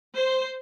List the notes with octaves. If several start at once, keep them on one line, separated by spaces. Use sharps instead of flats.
C5